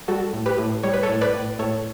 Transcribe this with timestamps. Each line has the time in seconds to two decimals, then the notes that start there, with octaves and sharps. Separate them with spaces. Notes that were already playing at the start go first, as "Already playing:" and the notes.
0.08 G3 F#4 A4
0.33 A2
0.46 G4 B4
0.58 A2
0.83 G3 C#5
0.93 B4
1.03 A4 C#5
1.09 A2
1.21 B4 D5
1.34 A2
1.59 A2 A4 C#5